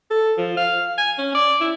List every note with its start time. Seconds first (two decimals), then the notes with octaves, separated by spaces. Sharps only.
0.11 A4
0.38 F3
0.57 F5
0.98 G#5
1.19 C#4
1.35 D5
1.61 E4